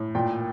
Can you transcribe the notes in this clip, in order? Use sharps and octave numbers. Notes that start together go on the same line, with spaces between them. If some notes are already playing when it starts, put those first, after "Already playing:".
Already playing: A2
A#2 G5